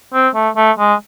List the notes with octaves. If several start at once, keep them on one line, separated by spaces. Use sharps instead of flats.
C4
A3
A3
G#3